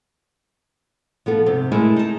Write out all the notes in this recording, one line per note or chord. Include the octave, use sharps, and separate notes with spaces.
F3 B3 A4
G#2 C3
G#3 A3 E4 G#4 A#4 G#5
D#4 A5